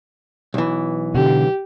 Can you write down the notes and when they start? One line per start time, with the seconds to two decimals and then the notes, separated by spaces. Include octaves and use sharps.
0.54 B1 E3
1.14 B2 D3 G4